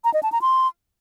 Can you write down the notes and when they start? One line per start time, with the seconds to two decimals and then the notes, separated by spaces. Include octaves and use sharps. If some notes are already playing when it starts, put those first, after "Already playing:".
0.04 A#5
0.14 D#5
0.23 A5
0.32 A#5
0.42 C6